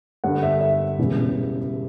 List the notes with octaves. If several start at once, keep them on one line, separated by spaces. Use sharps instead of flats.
G1 G2 D3 F#5
E5
E5
E1 E2 C#3 G3